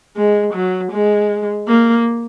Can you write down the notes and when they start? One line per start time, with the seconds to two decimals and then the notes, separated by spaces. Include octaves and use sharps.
0.16 G#3
0.54 F#3
0.92 G#3
1.68 A#3